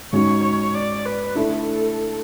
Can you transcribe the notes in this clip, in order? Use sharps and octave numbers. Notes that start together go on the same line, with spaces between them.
G#2 G#3 C#4 F#4 C#5
C#5
D5
B4
D3 A3 E4 A4